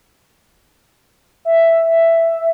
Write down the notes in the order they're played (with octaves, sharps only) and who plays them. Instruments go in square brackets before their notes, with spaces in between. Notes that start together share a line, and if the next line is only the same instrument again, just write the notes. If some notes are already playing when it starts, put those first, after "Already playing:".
[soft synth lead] E5